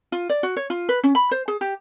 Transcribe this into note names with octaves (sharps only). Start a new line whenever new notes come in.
F4
D5
F#4
C#5
F4
B4
C#4
B5
C5
G#4
G4